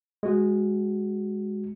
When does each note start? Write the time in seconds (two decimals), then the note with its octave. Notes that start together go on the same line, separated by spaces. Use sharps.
0.23 G#3 F#4